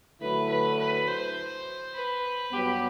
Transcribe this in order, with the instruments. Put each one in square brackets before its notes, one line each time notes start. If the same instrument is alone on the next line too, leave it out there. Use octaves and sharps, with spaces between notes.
[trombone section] D3 F#3 A3 E4 [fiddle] B4
[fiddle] B4
B4
C5
B4
[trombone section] G2 F#3 B3 [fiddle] G4